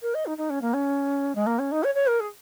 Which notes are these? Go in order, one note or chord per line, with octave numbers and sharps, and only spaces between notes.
A#4
D#5
D#4
D#4
C#4
A#3
C#4
G#3
A#3
C#4
D#4
C#5
C#5
A#4
G#4